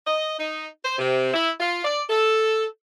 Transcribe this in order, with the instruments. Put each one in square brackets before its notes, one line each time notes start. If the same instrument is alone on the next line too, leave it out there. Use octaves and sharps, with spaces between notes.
[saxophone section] D#5
D#4
C5
C3
E4
F4
D5
A4